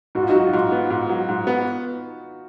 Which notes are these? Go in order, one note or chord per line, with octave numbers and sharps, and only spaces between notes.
G#2 F#4
F4
F#3 D#4 F#4
F4
G#2 D#4
B3
G#2
F#3
G#2
B3